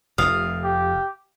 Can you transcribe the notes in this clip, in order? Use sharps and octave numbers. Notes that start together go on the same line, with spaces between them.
F1 F2 F5 D#6
G4